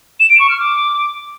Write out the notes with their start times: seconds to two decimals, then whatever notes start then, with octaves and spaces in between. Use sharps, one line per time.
0.20 E7
0.30 D7
0.40 C#6
0.49 F6
0.59 D6